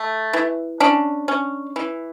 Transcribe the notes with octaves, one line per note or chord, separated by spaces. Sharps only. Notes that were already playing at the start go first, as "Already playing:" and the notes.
Already playing: A3
E3
C#4 D4
C#4
E3